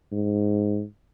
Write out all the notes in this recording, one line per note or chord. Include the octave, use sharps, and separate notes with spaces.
G#2